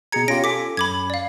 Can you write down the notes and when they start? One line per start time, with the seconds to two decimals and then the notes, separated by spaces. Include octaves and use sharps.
0.12 B2 G#4 A#5 G#6 C#7
0.28 C#4 F4 G4 A#6 D7
0.44 A4 G#5 D6 B6
0.77 F#2 B5 D6 G#6
1.10 D5 F5